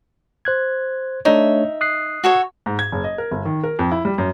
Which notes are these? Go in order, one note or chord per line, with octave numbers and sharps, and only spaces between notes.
C5 F#6 G#6
A3 D4 D#4 C#5 E5
D#6 F#6 C7
F#4 A4 C#5
G#2
G#6
F#1
D#5
A#4
G1
D#3
A#4
F2
E4
G3
F#2